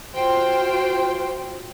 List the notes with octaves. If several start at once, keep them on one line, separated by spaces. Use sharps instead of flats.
F4 F#4 C5 G5